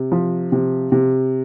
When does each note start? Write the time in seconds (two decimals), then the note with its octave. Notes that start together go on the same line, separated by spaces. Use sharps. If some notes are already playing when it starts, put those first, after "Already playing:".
Already playing: C3
0.12 F3
0.52 C3
0.92 C3